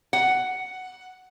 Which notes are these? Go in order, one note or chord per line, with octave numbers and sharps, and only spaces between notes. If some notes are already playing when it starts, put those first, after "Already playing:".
F#5